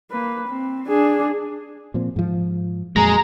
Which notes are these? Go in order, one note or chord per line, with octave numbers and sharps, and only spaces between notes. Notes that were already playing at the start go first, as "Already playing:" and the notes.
A#3 B4
C4
D4 G#4
A#2 F3 C4
G#2 F3
F2 A#2 F#3 G#3 A#5